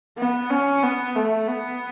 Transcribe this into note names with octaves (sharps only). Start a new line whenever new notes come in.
B3
C#4
B3
A3
B3